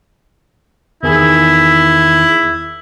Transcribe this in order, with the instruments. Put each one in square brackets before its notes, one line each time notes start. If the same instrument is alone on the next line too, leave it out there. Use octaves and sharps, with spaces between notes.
[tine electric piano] E2 D#3 G#4 [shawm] E4